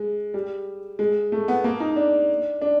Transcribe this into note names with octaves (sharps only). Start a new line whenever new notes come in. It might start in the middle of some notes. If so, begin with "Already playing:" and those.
Already playing: G#3
G3
G#3
A3
B3
A#3
D#4
D4
D4